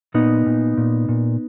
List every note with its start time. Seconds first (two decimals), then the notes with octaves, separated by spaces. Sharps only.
0.14 A#2 B3 D#4
0.46 A#2
0.77 A#2
1.09 A#2